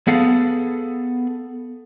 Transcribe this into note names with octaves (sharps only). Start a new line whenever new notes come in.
B3 G#4 A4 F5 F#5